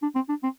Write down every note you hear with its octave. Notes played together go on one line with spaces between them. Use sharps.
D4
C4
D4
C4